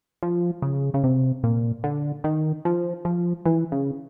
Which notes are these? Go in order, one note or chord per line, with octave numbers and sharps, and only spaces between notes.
F3
C#3
C#3
C3
A#2
D3
D#3
F3
F3
E3
C#3